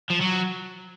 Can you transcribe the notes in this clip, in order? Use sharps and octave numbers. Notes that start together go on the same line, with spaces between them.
F3
F#3